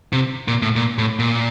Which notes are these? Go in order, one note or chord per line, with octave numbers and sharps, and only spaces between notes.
C3
A#2
A2
A#2
A2
A#2